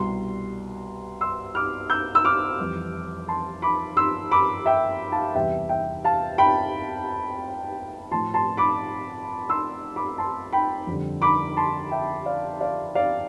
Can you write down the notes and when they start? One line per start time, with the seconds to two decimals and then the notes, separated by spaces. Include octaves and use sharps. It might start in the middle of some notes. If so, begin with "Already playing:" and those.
Already playing: C2 B2 G3 C6
1.21 C6 E6
1.55 D6 F6
1.90 E6 G6
2.15 E6
2.25 D6 F6
2.59 F2 E3 G3
3.28 A5 C6
3.62 B5 D6
3.97 C6 E6
4.31 B5 D6
4.66 E5 G5
5.12 F5 A5
5.35 E2 C3 E3 G3 E5 G5
5.69 E5 G5
6.04 F5 A5
6.38 G5 B5
8.11 A2 F3 A5 C6
8.34 A5 C6
8.57 B5 D6
9.49 C6 E6
9.96 B5 D6
10.18 A5 C6
10.53 G5 B5
10.87 F2 D3 G3
11.22 B5 D6
11.57 A5 C6
11.91 E5 G5
12.26 D5 F5
12.61 D5 F5
12.95 D5 F5